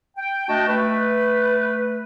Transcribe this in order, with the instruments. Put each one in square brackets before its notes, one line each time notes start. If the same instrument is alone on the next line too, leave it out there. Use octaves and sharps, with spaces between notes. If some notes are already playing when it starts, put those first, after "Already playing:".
[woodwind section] G5
A3 D4 F#4 D#5 G5 A5
A3 B4